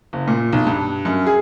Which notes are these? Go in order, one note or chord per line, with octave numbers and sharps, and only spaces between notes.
F#1
A#2
B1
G2
F#2
G#4